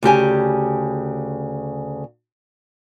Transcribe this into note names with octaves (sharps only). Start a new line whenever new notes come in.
D2 C#3 G4 G#5